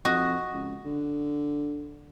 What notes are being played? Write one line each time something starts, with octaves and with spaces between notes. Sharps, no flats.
F2 F#4 D#5
C#2
D3